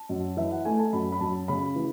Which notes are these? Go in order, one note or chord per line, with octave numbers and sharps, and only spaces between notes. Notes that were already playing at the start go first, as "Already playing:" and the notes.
Already playing: A5
F#2
E3 E5
F#5
A3 G#5
A5
F#2 B5
B5
F#2 A5
C#3 B5
E3